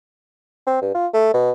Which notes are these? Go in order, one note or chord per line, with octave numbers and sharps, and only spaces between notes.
C4
G2
F4
A3
B2